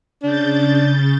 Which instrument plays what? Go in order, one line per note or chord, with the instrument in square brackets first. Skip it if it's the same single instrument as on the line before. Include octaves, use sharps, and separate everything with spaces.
[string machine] C#3 G6 A6 [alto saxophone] D4